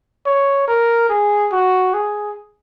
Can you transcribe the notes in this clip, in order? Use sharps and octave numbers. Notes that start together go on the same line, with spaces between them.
C#5
A#4
G#4
F#4
G#4